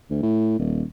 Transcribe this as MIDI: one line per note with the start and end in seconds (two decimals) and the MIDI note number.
0.10 0.21 38
0.23 0.56 45
0.59 0.83 27